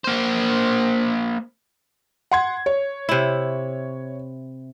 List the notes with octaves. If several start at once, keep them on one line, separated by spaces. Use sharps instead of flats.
A#3 C5
F#5 C6 G#6
C#5
C3 E4